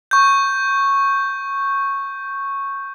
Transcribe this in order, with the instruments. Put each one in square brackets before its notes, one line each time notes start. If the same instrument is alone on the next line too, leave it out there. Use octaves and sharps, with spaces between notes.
[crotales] C#6 G6